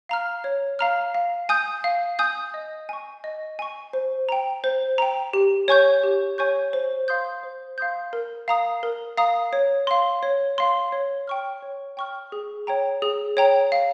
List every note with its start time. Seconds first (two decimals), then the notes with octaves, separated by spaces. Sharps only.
0.09 F5 A#5 F6
0.44 C#5
0.79 F5 A#5 F6
1.15 F5
1.49 G#5 D#6 G6
1.84 F5
2.19 G#5 D#6 G6
2.54 D#5
2.89 G#5 C#6
3.24 D#5
3.59 G#5 C#6
3.93 C5
4.29 G5 A#5
4.64 C5
4.98 G5 A#5
5.33 G4
5.68 C#5 G#5 C#6 G6
6.03 G4
6.38 C#5 G#5 C#6 G6
6.73 C5
7.08 F5 C6 D#6 G6
7.43 C5
7.78 F5 C6 D#6 G6
8.13 A#4
8.48 F5 A#5 D#6
8.83 A#4
9.17 F5 A#5 D#6
9.53 C#5
9.87 F5 C6
10.23 C#5
10.58 F5 C6
10.92 C#5
11.28 G5 C#6 F6
11.62 C#5
11.97 G5 C#6 F6
12.32 G#4
12.67 C#5 G5 A#5
13.02 G#4
13.37 C#5 G5 A#5
13.72 F5